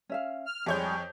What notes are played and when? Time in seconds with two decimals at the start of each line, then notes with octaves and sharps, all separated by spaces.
0.09 C#4 E5 F5
0.46 F6
0.66 F2 G3 G#3 G#4 C#5 G6